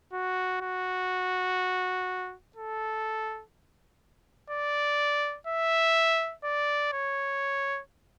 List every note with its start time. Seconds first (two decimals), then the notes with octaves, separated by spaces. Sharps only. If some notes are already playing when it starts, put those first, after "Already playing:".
0.13 F#4
0.61 F#4
2.56 A4
4.50 D5
5.47 E5
6.44 D5
6.93 C#5